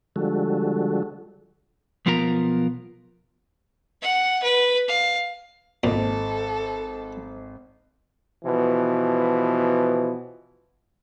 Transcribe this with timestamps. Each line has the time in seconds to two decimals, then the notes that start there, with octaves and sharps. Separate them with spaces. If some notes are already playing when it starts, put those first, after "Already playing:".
0.16 D3 F3 G3 G#3 F#4 A4
2.06 B1 F3 B3 F4 A#4 A#5
4.02 F#5
4.43 B4
4.88 F5
5.84 G#1 A#2 A4 C5 D#5
8.45 B2 E3 F3